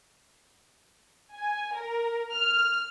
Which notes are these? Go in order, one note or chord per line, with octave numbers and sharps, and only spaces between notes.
G#5
A#4
F6